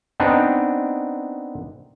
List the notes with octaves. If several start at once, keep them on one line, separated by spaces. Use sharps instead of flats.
B3 C4 D4 D#4